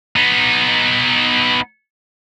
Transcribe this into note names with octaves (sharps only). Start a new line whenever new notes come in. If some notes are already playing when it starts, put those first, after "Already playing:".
B3 D#4